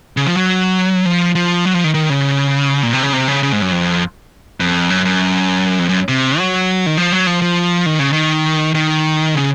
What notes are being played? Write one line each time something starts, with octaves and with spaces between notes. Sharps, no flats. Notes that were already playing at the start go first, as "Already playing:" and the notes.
C#3
F3
F#3
F3
F3
F#3
F3
D#3
D#3
C#3
A#2
C3
C#3
C3
C#3
C#3
G#2
F#2
F2
F2
F#2
F#2
F2
F#2
C3
F#3
D#3
F3
F#3
F3
F3
D#3
C#3
D#3
D#3
C#3